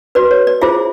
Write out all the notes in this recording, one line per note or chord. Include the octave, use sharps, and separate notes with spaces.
F#4 B4 D5
C#5
D5
E4 F4 G#4 C5 E5